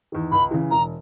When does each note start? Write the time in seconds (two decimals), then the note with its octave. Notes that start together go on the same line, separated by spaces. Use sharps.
0.12 E2 D#3
0.31 C#2 B5
0.51 C#3 E3
0.70 E1 A#5